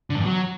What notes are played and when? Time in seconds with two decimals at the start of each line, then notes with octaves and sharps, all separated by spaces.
0.10 D3
0.15 G2
0.20 E2
0.25 F#3